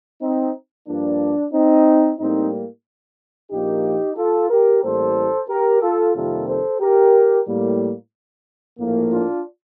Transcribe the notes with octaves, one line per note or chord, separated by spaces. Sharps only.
C4 D#4
G2 F3 A#3 D4
C4 D#4
A2 G3 A#3 C4 D#4
A#1 A#2 F3 A#3 D#4 G4
F4 A4
G4 A#4
A1 A2 G3 A#3 A4 C5
G4 A#4
F4 A4
F2 C3 D#3 G3 A#3 F4 A4
A4 C5
G4 A#4
A2 G3 A#3
A#1 A2 F3 A#3
D4 F4